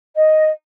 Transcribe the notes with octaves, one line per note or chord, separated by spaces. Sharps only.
D#5